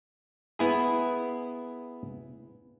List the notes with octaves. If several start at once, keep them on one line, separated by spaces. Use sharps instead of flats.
B3 E4 G#4